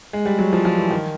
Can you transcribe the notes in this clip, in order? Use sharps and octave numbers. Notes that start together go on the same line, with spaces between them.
G#3
G3
F#3
F3
F3
E3
D#3